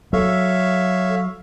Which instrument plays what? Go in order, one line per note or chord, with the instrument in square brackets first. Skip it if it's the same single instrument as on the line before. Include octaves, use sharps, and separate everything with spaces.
[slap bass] F#3 [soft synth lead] A4 [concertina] C#5 E5 F5